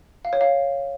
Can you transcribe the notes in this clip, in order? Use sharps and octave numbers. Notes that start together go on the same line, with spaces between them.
F5
C#5
F5